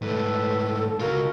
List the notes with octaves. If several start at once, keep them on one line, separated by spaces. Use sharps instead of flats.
G#2 A3 A4 B4
C#2 F4 F#4 A#4